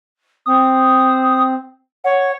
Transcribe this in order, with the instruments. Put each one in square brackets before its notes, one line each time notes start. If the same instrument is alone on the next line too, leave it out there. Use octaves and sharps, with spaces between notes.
[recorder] C4 [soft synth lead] D#6
[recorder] C#5 [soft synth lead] F#5